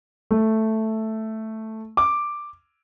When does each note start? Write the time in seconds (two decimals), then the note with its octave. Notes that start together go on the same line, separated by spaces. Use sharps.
0.31 A3
1.97 D6